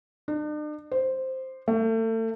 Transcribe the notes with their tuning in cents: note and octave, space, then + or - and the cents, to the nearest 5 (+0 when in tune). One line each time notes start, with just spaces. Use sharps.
D4 +45
C5 +0
A3 +35